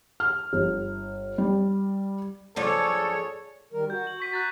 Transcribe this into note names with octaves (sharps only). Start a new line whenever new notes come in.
F6
G1
G3
F3 D4 G#4 A4 C#5
D#3 G3 A#4
F#4 G6
F#7
C#6 B6 D#7
A#5 F#6 A6